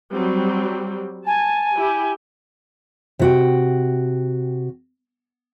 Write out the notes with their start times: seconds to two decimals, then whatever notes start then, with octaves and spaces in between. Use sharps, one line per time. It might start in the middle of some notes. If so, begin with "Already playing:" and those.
0.12 F#3 G3 C4
1.26 G#5 A5
1.77 E4 G4
3.19 C3 F#4 G5